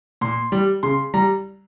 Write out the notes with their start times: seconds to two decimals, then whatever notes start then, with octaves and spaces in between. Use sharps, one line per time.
0.21 A#2 C6
0.52 G3
0.83 C#3 C6
1.14 G3 A#5